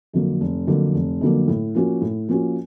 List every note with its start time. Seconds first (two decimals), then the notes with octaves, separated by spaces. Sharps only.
0.13 F2 D3 F#3 A#3
0.41 F1
0.67 F2 D3 F#3 A#3
0.94 F1
1.21 F2 D3 F#3 A#3
1.48 A2
1.75 F3 A#3 C#4 F#4
2.02 A2
2.28 F3 A#3 C#4 F#4